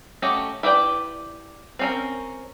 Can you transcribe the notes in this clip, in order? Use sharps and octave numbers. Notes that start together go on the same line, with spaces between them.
A3 C#4 F#4 G4 D#5
E4 G4 B4 D5 G5
C4 C#4 A#4